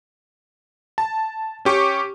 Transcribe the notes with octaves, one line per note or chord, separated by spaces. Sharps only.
A5
C#4 G4 C#6